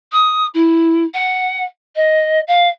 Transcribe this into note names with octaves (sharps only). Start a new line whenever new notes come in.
D#6
E4
F#5
D#5
F5